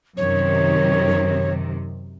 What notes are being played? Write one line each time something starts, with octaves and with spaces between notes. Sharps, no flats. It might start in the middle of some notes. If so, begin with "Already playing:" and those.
F#2 C3 D#3 C#5